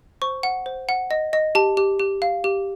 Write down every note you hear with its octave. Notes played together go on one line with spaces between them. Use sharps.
C5 C#6
F#5
C5
F#5
D#5
D#5
G4 A5
G4
G4
F5
G4